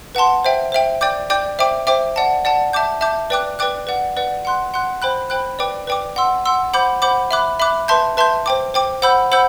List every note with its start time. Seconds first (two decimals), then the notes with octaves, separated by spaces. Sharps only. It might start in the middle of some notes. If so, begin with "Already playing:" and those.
0.15 B4 F#5 A5 C6
0.45 C5 E5 G5
0.72 C5 E5 G5
1.01 D5 G5 D6 G6
1.30 D5 G5 D6 G6
1.59 C5 E5 G5 D6
1.87 C5 E5 G5 D6
2.16 D5 F#5 A5
2.45 D5 F#5 A5
2.73 E5 A5 D6 G6
3.01 E5 A5 D6 G6
3.30 B4 D5 G5 D6 F#6
3.59 B4 D5 G5 D6 F#6
3.87 B4 D5 F#5
4.17 B4 D5 F#5
4.45 F#5 C6 F#6
4.74 F#5 C6 F#6
5.02 C5 G5 B5 F#6
5.30 C5 G5 B5 F#6
5.59 B4 D5 G5 D6
5.87 B4 D5 G5 D6
6.16 F#5 C6 E6
6.45 F#5 C6 E6
6.74 C5 F#5 B5 D6 G6
7.02 C5 F#5 B5 D6 G6
7.31 E5 B5 D6 F#6
7.60 E5 B5 D6 F#6
7.88 B4 E5 A5 C6 G6
8.17 B4 E5 A5 C6 G6
8.46 C5 G5 D6
8.74 C5 G5 D6
9.02 C5 F#5 B5 E6 G6
9.32 C5 F#5 B5 E6 G6